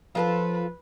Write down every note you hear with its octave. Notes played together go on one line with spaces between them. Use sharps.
F3 F4 G#4 A4 B4